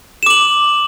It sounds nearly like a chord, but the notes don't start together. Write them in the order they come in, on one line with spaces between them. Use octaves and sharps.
E7 D6 F#7